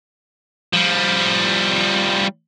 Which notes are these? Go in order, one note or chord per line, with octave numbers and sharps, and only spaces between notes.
F3 G3